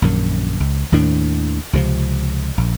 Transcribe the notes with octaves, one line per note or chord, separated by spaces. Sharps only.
A#1 F#2 D#3
C#2
D#2 A2 D#3 D4
C#2 C3 E3 F3
A#1